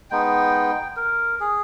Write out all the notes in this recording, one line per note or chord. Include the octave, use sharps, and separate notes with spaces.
G#3 B3 D#4 G5
A#4
G#4